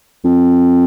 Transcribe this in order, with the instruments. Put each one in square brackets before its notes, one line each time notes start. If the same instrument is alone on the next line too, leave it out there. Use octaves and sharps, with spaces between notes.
[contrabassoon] F2